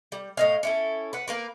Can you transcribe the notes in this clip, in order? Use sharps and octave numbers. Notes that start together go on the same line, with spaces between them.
G3
A2 D#5 F5
C#4 E4 A4
B4 F#5
A#3 A#4 B4